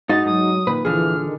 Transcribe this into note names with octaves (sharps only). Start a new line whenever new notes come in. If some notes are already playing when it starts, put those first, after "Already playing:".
G#2 D#4 F#4 D#5 A6
G#2 F#3 D#6
A#2 D#3 B4
A#1 D3 E3 F3 G#4 F6
D#3